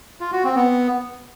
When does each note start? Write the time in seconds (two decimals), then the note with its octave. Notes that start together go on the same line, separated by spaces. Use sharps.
0.21 F4
0.32 F#4
0.44 C4
0.55 B3